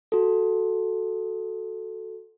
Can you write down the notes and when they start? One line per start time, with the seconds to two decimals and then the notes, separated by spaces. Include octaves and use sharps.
0.12 F#4 A4